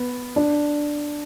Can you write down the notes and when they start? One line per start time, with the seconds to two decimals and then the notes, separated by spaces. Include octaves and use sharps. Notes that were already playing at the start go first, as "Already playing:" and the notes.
Already playing: B3
0.36 D4